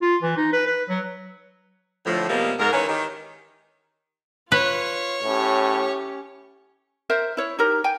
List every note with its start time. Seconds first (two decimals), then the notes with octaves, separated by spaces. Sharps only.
0.02 F4
0.23 E3
0.37 D#4
0.53 B4
0.66 B4
0.89 F#3
2.06 A2 D3 F3
2.29 C3 F3 G3 G#3 A#3 B3
2.59 G#2 A#4
2.73 D#3 E3 C#4 B4 C#5
2.89 D#3 G4
4.52 F4 B4 C#5
5.24 A2 C#4 G4
7.10 A#4 C5 E5
7.37 E4 C#5
7.59 D#4 G4 A#4
7.84 G5 G#5